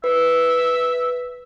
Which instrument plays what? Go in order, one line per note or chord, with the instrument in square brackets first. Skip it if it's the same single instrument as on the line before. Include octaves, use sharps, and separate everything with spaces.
[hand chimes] B4 [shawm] E5